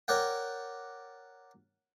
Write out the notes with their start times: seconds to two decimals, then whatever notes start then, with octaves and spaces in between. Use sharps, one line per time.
0.08 A#4 C#5 D5 F#5 G5